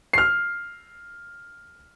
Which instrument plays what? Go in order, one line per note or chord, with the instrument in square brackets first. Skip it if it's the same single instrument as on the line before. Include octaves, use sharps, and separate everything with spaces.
[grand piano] F6 C7